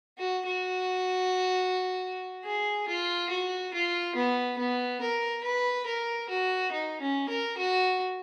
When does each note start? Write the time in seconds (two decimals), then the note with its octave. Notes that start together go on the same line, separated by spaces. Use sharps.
0.18 F#4
0.46 F#4
2.45 G#4
2.88 F4
3.30 F#4
3.74 F4
4.15 B3
4.58 B3
5.01 A#4
5.44 B4
5.86 A#4
6.29 F#4
6.72 D#4
7.01 C#4
7.29 A#4
7.57 F#4